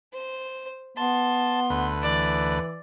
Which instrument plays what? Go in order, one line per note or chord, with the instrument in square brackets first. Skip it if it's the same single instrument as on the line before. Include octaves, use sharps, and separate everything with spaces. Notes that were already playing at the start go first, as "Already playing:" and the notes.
[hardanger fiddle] C5
[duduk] B3 [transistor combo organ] A5 [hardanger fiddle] C6
[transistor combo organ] D2 B4
[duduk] E3 [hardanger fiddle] D5